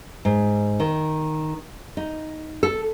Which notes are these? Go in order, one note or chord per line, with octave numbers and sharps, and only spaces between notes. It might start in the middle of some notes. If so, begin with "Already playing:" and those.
G#2
D#3
D#4
A4